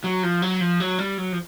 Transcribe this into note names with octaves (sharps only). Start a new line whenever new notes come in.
F#3
F3
F#3
F3
F#3
G3
F#3
F3